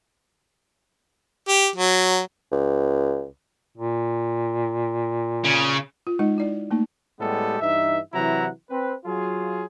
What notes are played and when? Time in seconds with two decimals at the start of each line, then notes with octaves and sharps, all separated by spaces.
1.48 G4
1.76 F#3
2.52 C#2
3.78 A#2
5.44 C#3
6.07 F4
6.19 G#3 D#4 D#5
6.38 E4 D5
6.71 A3 A#3 D#4
7.20 A2 G3 G#3 B3 G4 A4
7.60 G2 E3 D#4 E5
8.14 C3 E3 F#3 E4 F#5 A#5
8.70 C4 B4
9.06 F#3 F4 G#4